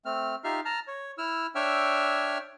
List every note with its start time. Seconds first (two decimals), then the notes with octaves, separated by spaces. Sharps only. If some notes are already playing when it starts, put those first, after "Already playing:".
0.05 A3 C4 F6
0.44 D#4 F4 G4 E5 F5 F6
0.65 A5 A#5 F6
0.87 C#5
1.18 E4 E6 F6
1.55 D4 C#5 E5 G5 E6 F6